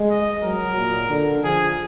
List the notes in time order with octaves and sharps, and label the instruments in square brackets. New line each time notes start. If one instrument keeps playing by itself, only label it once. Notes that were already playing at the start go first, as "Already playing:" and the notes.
Already playing: [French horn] G#3
[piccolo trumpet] D#5
[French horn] F#3 [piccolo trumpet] A#4
[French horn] A#2
D3
[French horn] F3 [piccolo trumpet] G#4